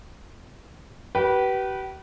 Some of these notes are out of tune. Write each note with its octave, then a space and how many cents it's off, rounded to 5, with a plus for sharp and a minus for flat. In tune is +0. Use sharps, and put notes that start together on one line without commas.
G4 -40 B4 -20